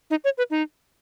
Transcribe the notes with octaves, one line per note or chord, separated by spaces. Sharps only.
D#4
C#5
B4
D#4